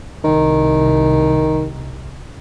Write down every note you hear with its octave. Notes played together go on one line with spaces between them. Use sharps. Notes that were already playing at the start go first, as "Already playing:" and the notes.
C2 D#3